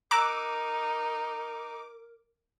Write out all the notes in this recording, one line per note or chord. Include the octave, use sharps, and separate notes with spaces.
D#4 A#4 A#5 D6 E6 F#6